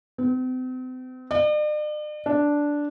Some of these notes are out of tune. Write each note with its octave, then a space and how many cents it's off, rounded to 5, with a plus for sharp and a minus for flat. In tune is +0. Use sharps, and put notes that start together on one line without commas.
C4 -40
D5 +45
D4 -5